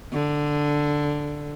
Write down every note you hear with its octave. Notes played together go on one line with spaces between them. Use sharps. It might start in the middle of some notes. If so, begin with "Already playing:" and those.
D3